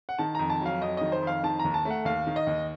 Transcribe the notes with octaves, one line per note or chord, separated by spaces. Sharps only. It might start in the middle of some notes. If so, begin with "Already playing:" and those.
F#5
D#3 A5
F2 A#5
A5
F#3 F5
F2 D#5
D#3 D#5
C5
F2
F5
D#3 A5
D#2 A#5
A5
A3
F#5
D#2 F5
D#3
D#5
D#2